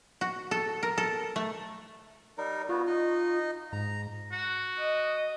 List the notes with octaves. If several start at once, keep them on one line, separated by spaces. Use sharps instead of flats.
F#4
A4
A#4
A4
A3
G3 D#4 A#4
B3 F4 F#4
D#4 D#5
G#2 A#5
F#4
D#5